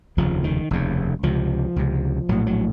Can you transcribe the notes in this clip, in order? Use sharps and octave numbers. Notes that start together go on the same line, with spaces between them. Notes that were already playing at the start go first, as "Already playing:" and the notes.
F1 D#2 C#3 F3
D#3
F1 D#2 C#3
C#2 C3 F3
C#2 C3
A#1 A2 F#3
F#3